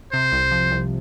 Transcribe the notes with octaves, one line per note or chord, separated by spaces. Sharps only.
C3 C5
C2
F3
C2